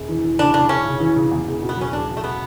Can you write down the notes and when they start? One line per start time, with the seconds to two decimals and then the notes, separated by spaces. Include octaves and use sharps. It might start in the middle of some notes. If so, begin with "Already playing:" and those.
Already playing: E1
0.09 E3
0.24 E3
0.39 C#3 D4
0.54 C#3 D4
0.69 C#3 C#4
0.85 C#3
1.00 E3
1.16 C#3
1.31 E2
1.47 E1
1.62 B2
1.69 B3
1.77 F#3 C#4
1.92 E1 D4
2.09 E1
2.17 A3
2.24 B3